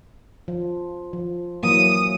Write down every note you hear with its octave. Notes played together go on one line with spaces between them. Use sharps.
F3
F3
E3 F#3 A#3 D#6